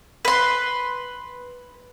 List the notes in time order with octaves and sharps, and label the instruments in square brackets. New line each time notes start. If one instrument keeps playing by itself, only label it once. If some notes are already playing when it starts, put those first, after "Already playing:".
[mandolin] B4 C6